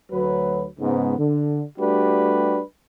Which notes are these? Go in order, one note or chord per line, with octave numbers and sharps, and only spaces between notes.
D2 F#3 B4
G#2 C#3 B3
D3
G3 A3 D4 F#4 G4 B4